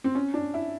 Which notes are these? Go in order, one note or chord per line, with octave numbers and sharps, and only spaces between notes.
C4
C#4
D4
E4